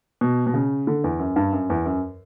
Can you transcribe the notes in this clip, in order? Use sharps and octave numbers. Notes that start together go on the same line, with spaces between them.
B2
B2
C#3
D3
E2
F#2
G2
F#2
E2
F#2